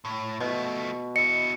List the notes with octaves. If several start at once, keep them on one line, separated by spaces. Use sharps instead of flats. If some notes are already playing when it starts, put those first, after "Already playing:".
A2
B2 F3 A3
E4 D#5 C#7